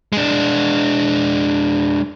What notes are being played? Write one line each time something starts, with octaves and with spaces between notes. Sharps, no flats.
G#3 D4